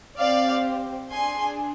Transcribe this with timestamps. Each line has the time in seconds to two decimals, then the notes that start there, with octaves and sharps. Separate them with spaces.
0.17 C4 G4 D5 F5
1.10 D4 G#4 G#5 C6